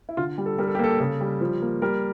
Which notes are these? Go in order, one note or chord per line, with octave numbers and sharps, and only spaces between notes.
E4
D3 F4
G3
A4
G3 A#4
A4
G4
A#3 A4
C#3 A4
G3
F3
A#3
G3 A#4